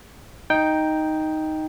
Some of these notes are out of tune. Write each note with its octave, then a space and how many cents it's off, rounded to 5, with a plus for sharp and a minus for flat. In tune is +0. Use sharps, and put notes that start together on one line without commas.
D#4 +0 G5 +0